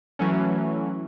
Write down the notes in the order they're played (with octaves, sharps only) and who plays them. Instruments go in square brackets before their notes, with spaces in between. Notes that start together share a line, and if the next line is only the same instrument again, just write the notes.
[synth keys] E3 F#3 A3 C#4